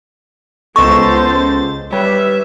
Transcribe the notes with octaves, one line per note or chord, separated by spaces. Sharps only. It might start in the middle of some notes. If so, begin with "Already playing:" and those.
C#2 B3 A4 C5 D#5 A5 C#6 A6
G3 B4 C#5 E5